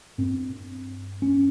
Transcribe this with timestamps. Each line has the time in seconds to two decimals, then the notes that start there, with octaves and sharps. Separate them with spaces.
0.18 G2 C4
1.22 C#4